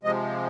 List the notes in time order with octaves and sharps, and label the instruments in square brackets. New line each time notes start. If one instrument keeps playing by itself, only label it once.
[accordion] C3 F3 G#3 D#5